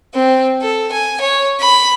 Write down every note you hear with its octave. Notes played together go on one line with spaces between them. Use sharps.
C4
A4
G#5
C#5
B5